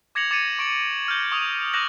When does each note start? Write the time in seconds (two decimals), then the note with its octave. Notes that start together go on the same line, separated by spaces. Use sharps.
0.15 D6 G#6 A#6 C#7 F7 F#7
0.31 D6 A6 C#7 D#7 E7
0.59 C#6 D7 E7 F#7
1.08 F6 G6
1.32 C#6 D#6 F7 F#7
1.73 D6 D#6 F#6 G6 A#6 F#7